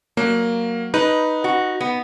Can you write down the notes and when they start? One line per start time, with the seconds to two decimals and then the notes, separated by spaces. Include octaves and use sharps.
0.17 F#3 A#3
0.94 D#4 B4
1.44 F#4
1.81 B3